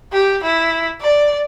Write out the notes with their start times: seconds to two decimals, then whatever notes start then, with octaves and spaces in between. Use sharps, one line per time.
0.12 G4
0.43 E4
1.01 D5